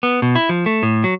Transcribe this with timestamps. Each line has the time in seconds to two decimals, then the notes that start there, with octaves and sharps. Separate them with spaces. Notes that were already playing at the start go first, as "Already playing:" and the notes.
0.03 B3
0.22 B2
0.35 E4
0.49 F3
0.66 A3
0.83 A2
1.04 F#3